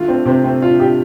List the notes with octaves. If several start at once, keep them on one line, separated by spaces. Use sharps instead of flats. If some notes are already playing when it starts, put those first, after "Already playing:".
Already playing: D3 A3 F4
C4 D4
C3 C4
A3 C4
D4 F4
D4 G4